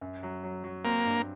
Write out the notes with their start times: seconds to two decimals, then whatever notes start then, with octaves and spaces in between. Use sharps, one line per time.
0.01 F#2
0.23 F#3
0.44 F#3
0.64 F#3
0.84 A#3 C4
1.05 G2